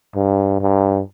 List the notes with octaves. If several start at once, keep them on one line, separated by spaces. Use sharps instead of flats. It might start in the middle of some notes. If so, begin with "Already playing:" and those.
G2
G2